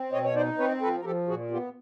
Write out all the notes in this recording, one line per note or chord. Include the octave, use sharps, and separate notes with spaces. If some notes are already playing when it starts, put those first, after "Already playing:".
Already playing: C4
B2 C#5 D#5
C#5
D#4 C5 D5
C4 B4 C#5
F3 A4 B4
A#4
F3 G4 A4
A#2 F#4 G#4
B3 F4 G4